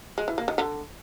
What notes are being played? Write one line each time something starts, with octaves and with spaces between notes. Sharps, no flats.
G#3
E3
A#3
D#3
D3